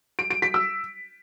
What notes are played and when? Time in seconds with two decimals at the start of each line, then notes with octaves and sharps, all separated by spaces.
0.19 D7
0.30 D7
0.42 B6
0.54 E6